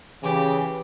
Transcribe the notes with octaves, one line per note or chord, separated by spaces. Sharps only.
C#3 E3 G4